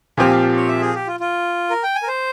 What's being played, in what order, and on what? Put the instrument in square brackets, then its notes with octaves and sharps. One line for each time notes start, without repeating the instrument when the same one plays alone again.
[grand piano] A#2 F3 C4 G4 [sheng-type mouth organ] G#5
[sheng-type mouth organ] F5
C#5
E5
G#4
G4
F4
F4
A#4
G5
G#5
A#4
C5